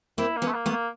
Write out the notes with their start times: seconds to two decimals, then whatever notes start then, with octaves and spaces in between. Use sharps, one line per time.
0.18 A#3 C4 E4
0.37 A#3
0.42 B3 C#4
0.48 A3
0.54 A#3
0.66 A3 B3
0.72 A#3